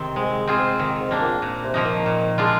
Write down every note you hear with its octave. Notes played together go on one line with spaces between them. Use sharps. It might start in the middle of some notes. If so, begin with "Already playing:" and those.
Already playing: C3 D#3 C4
G#2 G#3
C4 F4 G#4 C5
G#2
D#3
G#2
A#3 D4
A#2
A#2
C3
F3 A#3 D#4
D#3
A#2
G#3 D4 F4